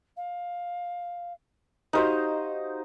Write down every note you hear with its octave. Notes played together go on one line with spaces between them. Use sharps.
F5
D#4 F#4 G4 C5 D#5 F5